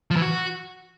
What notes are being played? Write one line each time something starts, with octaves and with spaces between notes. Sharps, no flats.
F3
E3
F#4